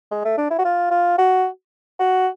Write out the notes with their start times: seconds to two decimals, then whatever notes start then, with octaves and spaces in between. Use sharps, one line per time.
0.11 G#3
0.25 A3
0.38 D4
0.50 E4
0.58 F#4
0.65 F4
0.91 F4
1.18 F#4
1.99 F#4